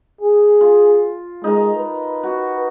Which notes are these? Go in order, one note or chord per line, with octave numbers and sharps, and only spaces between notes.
G#4
F4
G#3 D#4 A#4
B4
F#4